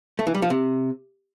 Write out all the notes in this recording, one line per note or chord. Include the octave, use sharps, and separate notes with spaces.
A3
E3
G3
F3
C3